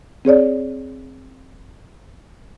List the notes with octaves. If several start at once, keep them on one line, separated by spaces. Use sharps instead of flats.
C4 G#4 C#5 D5